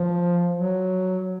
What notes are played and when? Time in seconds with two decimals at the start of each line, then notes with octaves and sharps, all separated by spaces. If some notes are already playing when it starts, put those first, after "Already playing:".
Already playing: F3
0.55 F#3